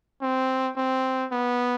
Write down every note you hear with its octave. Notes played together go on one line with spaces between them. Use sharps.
C4
C4
B3